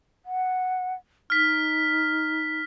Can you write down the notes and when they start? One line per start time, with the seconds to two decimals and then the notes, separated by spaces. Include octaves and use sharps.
0.25 F#5
1.30 D#4 F6 B6